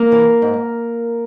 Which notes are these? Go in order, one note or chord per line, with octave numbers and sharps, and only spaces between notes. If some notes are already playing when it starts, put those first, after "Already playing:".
Already playing: A#3 A#4
E3
G#2